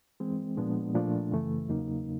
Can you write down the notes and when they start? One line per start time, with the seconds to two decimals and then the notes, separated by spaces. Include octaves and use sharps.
0.20 E3 G#3 C4
0.57 A#2 F3 G#3 B3 D4
0.94 A#2 F3 A3 D4
1.32 F#2 C#3 E3 A3
1.68 E2 C#3 F#3 A#3 D#4